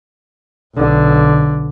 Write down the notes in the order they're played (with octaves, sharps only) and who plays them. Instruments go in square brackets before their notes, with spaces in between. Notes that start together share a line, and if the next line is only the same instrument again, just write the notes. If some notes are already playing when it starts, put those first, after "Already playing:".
[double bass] B1 D3